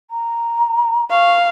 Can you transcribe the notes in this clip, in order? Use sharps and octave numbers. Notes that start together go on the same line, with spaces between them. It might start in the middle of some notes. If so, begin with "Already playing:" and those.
A#5
F5 C#6